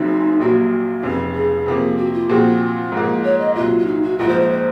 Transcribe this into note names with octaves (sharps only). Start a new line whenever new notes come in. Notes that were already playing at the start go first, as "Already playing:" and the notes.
Already playing: F#1 F#2 C#3 F#3 C4 D#4
A#1 A#2 F#3 F#4
F1 F2 C#3
G#4
C3 F3 A#3
F#4
F4
A#2 F3 C4 F#4 G#4
F4
G#2 F3 A#3
C#5
D#5
C2 A#2 F#3 F4
F4
D#4
F#4
A#1 G#2 F3 F4
C5
C5
C5